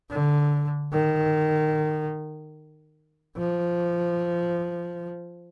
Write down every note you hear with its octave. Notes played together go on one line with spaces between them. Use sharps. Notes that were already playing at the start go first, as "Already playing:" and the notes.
D3
D#3
F3